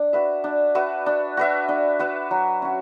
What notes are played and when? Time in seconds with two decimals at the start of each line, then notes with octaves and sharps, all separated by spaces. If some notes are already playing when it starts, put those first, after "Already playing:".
Already playing: D4
0.13 F#4 B4 E5
0.44 D4
0.75 F#4 B4 E5
1.06 D4
1.37 F#4 B4 E5
1.68 D4
1.99 F#4 B4 E5
2.31 F#3
2.62 C#4 F#4